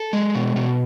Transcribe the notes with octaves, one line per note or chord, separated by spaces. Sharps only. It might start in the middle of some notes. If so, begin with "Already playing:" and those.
Already playing: A4
G#3
B2
B2